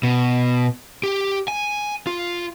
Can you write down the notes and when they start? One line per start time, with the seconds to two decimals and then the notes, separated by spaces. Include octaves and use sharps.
0.03 B2
1.03 G4
1.48 G#5
2.07 F4